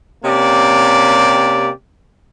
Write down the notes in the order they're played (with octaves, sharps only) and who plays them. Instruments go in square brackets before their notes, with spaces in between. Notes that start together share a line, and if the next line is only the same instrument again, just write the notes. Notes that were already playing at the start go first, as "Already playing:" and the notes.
[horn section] C3 A#3 C#4 G4 D5